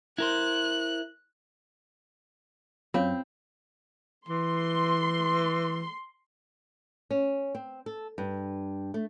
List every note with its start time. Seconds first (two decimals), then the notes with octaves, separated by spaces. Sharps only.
0.18 E4 A#4 C5 F#6
2.94 F#2 C4 F4 C#5 F5
4.28 E3 C6
7.11 C#4
7.55 C4
7.86 A4
8.18 G2
8.94 A3